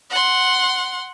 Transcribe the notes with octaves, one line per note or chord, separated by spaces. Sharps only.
F#5 C6